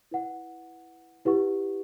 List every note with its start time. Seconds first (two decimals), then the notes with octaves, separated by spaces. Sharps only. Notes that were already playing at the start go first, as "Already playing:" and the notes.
0.11 E4 B4 F#5
1.25 E4 G4 B4 F#5 C#6